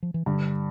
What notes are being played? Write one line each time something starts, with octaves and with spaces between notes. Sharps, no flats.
F3
E3
G2 D3